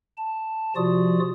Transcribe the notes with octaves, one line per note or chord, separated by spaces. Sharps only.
A5
C3 F3 F4 F#4 D5 D#6